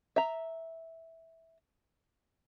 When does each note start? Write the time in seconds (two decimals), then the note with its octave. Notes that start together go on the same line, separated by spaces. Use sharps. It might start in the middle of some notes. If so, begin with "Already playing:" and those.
0.16 E5 A#5